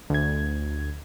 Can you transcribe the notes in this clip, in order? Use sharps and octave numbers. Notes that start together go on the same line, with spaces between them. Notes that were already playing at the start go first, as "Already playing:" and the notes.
D2 G#6